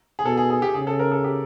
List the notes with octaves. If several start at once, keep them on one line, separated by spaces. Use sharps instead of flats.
G#4
B2 A4
G#4
G#4
G4
C#3 G#4
A4
A#4
A4
G4